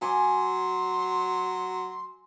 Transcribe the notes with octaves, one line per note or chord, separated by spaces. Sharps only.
F#3 G#5 C6 D6